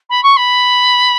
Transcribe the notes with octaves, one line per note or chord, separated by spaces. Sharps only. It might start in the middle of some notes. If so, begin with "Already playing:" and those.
B5
C#6
B5